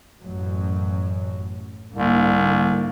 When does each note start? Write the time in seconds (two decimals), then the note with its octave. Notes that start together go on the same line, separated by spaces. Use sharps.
0.22 A1 F#2 F#3
1.96 C2 G#2 D3 A#3